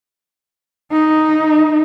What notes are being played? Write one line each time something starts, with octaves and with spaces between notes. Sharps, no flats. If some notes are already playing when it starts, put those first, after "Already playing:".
D#4